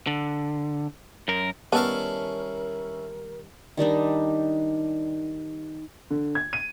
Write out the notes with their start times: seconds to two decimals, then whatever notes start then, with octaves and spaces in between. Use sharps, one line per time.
0.07 D3
1.28 F#2 A#4
1.72 D#3 G3 B3 C#4 E4 A#4 F5 A5
3.77 D#3 G3 D4 D#4
6.10 D3
6.35 G#6
6.53 D#7